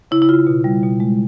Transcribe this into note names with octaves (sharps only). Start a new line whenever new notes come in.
C#3 E4
E4
C#3 F4
B2
G3
B2
G#3